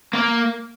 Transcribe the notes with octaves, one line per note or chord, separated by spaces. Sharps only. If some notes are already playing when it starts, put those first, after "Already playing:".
A#3